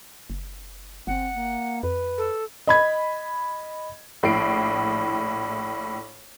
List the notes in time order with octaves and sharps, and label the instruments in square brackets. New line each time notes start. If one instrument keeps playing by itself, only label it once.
[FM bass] F#1
[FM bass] G1 [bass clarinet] C4 [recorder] F#5
[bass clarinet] A#3
[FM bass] F2 [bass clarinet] B4
[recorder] A4
[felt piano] D#5 B5 G#6
[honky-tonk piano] A#1 A2 E4 C7 D7